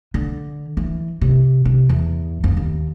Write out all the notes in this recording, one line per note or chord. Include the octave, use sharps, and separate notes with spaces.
D3
E3
C3
C3
E2
F2
D#2